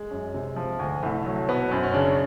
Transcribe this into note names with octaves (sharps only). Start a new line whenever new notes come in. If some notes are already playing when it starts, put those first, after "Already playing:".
Already playing: G#3
F#2
C3
F3
D2
C2 A3
F#3 A3
B2 B3
F#2 C4
C#4
C#3 D4